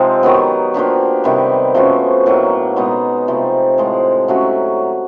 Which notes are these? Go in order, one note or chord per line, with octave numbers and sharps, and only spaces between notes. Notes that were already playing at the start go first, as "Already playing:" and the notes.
Already playing: C3 F3 G#3 C4 D#4
D#3 F#3 B3
F3 A#3 D4 G4
C3 D#3 G3 B3
F3 A3 C#4 F#4
A2 F#3 A#3 D#4
B2 G#3 B3 D#4
C3 F3 A3
A2 F3 G#3
F#3 A3 C#4 F#4